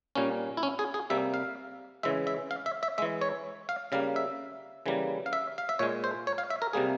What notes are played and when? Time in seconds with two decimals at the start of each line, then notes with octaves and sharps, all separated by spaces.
0.15 A#2 G3 A#3 C#4
0.57 E4
0.63 C#4
0.79 G#4
0.94 G#4
1.10 C3 G3 A#3 E5
1.34 F5
2.03 C#3 E3 G#3 E5
2.27 E5
2.51 F5
2.66 E5
2.83 E5
2.98 E3 G#3 E5
3.21 C#5
3.69 F5
3.92 C#3 G3 A#3 F5
4.16 E5
4.86 C#3 E3 G3 A#3
5.26 F5
5.33 E5
5.58 F5
5.69 E5
5.79 A#2 G#3 C#5
6.04 C5
6.27 C#5
6.38 F5
6.50 E5
6.62 A#4
6.73 C3 G3 A#3 G#4